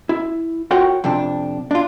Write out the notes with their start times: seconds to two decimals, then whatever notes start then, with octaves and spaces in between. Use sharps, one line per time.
0.09 E4
0.71 F4 F#4 A#4 C#5 F#5 G5
1.04 F2 C3 D4
1.71 D4 F4